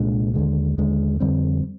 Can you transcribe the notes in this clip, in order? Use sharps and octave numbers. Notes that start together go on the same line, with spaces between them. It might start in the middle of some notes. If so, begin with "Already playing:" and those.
Already playing: C2 A#2 G#3 D4
D#2 D3 G#3
D#2 D3 G#3
F2 D3 G3 C4